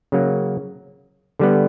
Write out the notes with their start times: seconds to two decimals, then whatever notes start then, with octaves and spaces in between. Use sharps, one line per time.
0.12 C#3 F#3 A#3
1.39 D3 G3 B3